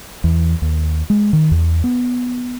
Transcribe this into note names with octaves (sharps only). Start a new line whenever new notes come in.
E2
D#2
G#3
D#3
E2
B3